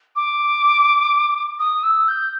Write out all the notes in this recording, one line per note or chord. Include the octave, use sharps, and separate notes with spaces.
D6
D#6
E6
G6